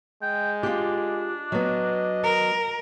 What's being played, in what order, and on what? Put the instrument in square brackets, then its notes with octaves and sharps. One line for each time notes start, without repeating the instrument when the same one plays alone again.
[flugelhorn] G#3 [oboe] G5
[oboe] D4 [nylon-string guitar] F4 G4
[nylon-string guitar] F#3 B3 [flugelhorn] D#5
[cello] A#4